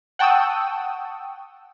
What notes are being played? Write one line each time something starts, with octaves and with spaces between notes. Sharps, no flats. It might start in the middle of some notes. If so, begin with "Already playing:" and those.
F#5 G5 A5 C#6 D#6 E6